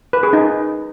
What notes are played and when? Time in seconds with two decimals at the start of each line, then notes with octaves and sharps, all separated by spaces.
0.13 B4
0.23 G#4
0.33 D#4